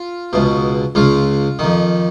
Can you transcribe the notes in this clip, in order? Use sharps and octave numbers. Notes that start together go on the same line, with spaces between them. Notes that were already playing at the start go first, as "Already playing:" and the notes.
Already playing: F4
C#2 B2
C#2 C#3 F4
F2 D#3